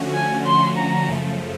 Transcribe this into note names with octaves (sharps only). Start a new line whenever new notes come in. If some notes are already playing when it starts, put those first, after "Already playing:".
Already playing: D3 F3 A3 C#4 F#4
G#5
C6
A#5
F#2 C#3 F3 A3